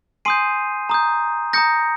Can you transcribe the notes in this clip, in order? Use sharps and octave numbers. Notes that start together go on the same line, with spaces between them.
G#5 C6 D#6 G6 C7 D#7
A#5 D#6 G6
A#5 D#6 G6 A#6 C#7